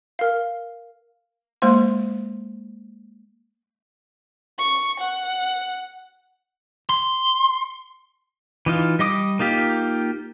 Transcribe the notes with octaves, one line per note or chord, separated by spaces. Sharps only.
A#4 F5
G#3 A#3 C5 C6
C#6
F#5
C6
E3 D#4 F4
G3 D#5 D6 D#6
A#3 D#4 F4 G4